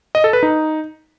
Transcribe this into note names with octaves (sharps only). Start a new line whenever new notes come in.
D#5
A4
B4
D#4